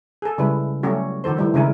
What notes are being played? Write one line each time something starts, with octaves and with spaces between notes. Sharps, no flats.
G#4 A4
C#3 G3 G#3 E4 B4
F#3 G3 A3 C#4 F#4 G4
D#3 F3 A4 C5
E3 G3 A3
C#3 G#3 D4 E4 A#4